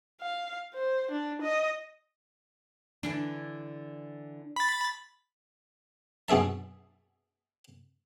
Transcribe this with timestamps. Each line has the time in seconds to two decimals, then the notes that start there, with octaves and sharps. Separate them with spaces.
0.21 F5
0.74 C5
1.11 D4
1.42 D#5
3.03 D3 E3 D4
4.56 B5 A6
6.28 F#2 B2 G#4 E5 A5